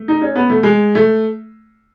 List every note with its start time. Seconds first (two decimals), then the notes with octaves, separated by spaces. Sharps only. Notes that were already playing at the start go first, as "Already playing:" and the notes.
Already playing: A3
0.08 D#4
0.22 C#4
0.35 B3
0.50 A3
0.63 G#3
0.95 A3